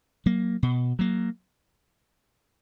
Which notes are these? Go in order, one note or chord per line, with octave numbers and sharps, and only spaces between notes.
F#3 A#3
B2
F#3 A#3